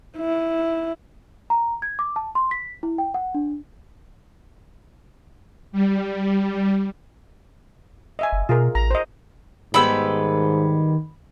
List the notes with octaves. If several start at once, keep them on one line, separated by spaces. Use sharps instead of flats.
E4
A#5
G#6
D6
A5
C6
B6
E4
G5
F#5
D4
G3
D#5 E5 G#5
F#1
B2 F4 G#4 A#4
A1 A#5
C5 D#5
G#2 D#3 G3 G#3 B3 B5 E6